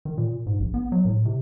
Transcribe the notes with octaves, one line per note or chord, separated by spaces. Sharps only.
D#3
A#2
G#2
A#1
B3
F#3
A2
C3